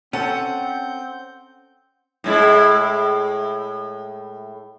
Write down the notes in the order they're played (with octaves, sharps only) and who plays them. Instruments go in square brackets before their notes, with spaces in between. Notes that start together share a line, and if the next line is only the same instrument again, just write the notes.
[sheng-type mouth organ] C4 G6 [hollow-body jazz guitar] C#4 A4 [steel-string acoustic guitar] F#5
[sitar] A2 G#3 E4